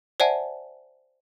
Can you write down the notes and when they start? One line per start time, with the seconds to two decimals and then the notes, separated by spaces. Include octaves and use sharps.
0.20 C5 D5 E5 F#5 G#5 A5